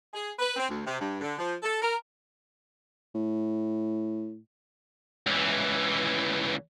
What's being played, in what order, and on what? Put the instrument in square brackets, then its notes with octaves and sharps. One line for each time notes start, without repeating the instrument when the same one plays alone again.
[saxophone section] G#4
B4
C4
D2
C3
G2
D3
F3
A4
A#4
[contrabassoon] A2
[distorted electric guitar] C#2 E3